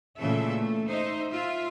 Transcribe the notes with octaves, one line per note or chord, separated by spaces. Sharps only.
A#2 C#3 E3 A3 A4 E5
A3
D#4 C5 D#5 E5
F4 E5